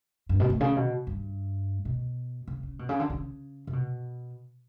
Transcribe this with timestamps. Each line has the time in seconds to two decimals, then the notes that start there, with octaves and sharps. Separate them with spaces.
0.29 G2
0.40 B2
0.50 A2
0.61 C#3
0.76 B2
1.07 G2
1.85 B2
2.48 C#3
2.63 C#3
2.79 B2
2.89 C#3
3.00 D3
3.10 C#3
3.67 C#3
3.73 B2